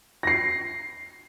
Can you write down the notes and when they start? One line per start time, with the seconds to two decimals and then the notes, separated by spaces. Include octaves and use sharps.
0.23 A#6 C7